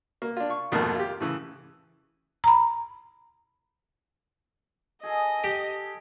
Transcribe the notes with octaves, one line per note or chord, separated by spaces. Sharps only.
A#3
D4 F4
C#6
F2 G#2 B2 D#3 A3 A#3
F4 G4
A2 C#3 E3
A#5 B5
G#4 A4 D#5
G4